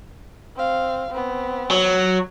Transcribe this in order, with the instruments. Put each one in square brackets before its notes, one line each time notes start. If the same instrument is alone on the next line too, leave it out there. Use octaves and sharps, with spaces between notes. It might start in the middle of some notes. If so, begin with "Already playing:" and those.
[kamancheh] C4 F5
B3 C4
[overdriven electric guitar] F#3